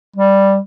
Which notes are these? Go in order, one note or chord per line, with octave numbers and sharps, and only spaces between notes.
G3